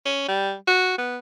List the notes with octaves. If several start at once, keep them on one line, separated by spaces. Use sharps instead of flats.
C#4
G3
F#4
B3